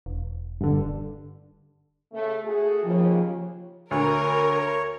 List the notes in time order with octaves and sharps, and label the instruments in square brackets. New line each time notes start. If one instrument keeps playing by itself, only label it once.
[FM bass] E1
[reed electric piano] G2 D3
[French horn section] C#3 A3
A3 F#4 G#4
[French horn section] D#2 C#3 [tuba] F3
[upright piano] D2 [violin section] A#4 [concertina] C#5